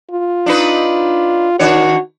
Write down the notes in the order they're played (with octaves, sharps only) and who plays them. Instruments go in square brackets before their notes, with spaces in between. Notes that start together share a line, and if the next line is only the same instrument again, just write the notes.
[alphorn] F4
[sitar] D4 D#4 B4
[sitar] D#3 D4 C#5 [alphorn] F#4